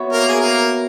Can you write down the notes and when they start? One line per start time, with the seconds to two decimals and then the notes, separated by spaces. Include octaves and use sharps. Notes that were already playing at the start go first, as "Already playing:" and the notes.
Already playing: B3 F#4 C#5 E5
0.13 A#3 A#4
0.29 G#4
0.40 A#3 A#4